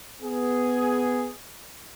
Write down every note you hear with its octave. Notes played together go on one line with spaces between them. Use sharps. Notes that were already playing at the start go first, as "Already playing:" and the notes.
B3 G#4